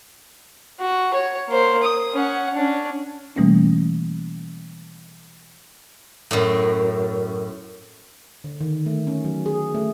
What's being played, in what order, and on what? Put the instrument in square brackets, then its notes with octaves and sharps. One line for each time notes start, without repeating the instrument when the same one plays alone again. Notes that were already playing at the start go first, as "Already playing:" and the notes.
[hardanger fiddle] F#4
C#5
A#3 C5
D#6
C#4 F#5
C#4 D4
[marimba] B2 E3 G3 A3 A#3 C#4
[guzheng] F#2 A2
[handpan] D3
D#3
A3
C#4
F#3
G#4
A3